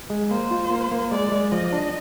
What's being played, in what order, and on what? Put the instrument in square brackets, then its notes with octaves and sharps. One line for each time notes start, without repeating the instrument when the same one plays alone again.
[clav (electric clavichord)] G#3
[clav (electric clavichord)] A#3 [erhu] C5
[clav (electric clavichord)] F4
A#3
A#3
[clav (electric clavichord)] G#3 [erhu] D5
[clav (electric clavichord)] G#3
[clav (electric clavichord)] F3 [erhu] D#5
[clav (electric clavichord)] D4